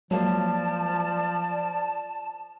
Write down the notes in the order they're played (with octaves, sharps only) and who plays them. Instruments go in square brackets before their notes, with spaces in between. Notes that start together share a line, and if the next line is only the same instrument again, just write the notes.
[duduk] F3 [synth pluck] F#3 G#3 A#3 [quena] D5 [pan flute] A5